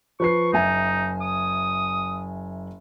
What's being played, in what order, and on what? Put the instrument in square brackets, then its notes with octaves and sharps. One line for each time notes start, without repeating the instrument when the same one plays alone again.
[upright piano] F3 B4 C7 [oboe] C#6
[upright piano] F#1 E5 G#5 [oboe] D#4
[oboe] D#6